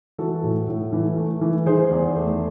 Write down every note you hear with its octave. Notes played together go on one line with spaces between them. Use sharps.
E3 F#4 A4
A2
A2
E3
A3
E3
D#3 G#4 C5
E2
A3